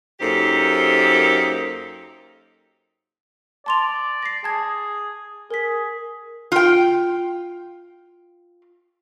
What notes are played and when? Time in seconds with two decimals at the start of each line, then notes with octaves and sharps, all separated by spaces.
0.20 F#2 A#3 D#4 G4 A4 C5
3.66 D5 A5 C6 F7
4.23 A#6 C7
4.44 G#4 A5 G#6
5.51 G#4 A#4 B6
6.52 F4 G5